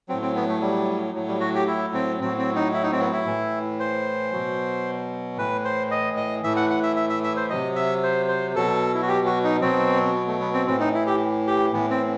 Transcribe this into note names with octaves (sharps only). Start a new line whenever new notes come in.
A2 F#3 C4
C4
B3
A3
G3
A2 F#3
G3
F#4
G4
E4
C4
A2 F#3 C4
C4
D#4
E4
D#4
C4
B3
E4
A2 E3
C5
B2 F#3
A2 E3 B4
C5
D#5
D#5
A2 E3 E5
F#5
F#5
E5
E5
E5
E5
C5
C3 F#3 D#5
E5
C5
C5
B2 F#3 A4
E4
F#4
G4
F#4
D#4
B2 F#3 C4
B3
A3
B3
C4
A2 E3 C4
D#4
E4
G4
G4
A2 E3 B3
C4